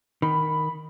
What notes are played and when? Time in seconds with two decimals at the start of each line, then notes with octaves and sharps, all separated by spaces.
0.22 D#3 B5